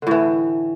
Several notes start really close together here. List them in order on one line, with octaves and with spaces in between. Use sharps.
D3 A2 E3